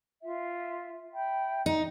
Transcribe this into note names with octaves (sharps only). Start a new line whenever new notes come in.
F4 E5
E5 G5 B5
D#4